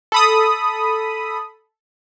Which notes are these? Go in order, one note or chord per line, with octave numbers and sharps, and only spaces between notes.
A4 B5 D#6